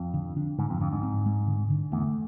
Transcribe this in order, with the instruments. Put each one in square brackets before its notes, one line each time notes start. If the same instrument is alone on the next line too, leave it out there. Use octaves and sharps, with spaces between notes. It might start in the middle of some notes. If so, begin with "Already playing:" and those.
Already playing: [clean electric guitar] F2
[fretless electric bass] D3
D4
[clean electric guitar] G#2 [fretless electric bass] D3
[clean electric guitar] F2
[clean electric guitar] F2 [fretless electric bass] D4
[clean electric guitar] G#2
[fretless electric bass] C4
G#3
D3
D3
[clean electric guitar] E2 [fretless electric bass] A3